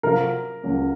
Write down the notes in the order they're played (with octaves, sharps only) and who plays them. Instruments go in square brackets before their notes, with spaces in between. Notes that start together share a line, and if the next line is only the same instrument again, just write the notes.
[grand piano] C3 F#3 C4 F4 [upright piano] A#4
[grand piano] C#2 C#3 F#3 A#3